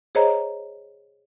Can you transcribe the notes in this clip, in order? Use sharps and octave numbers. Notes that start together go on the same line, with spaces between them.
G#4 C5 C#5 D#5 A#5